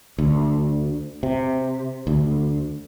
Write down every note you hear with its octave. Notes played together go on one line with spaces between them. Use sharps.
D2
C3
D2